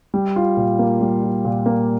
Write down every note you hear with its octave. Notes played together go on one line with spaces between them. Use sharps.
G3
F4
A#2
A#3
G3
F4
A#2
A#3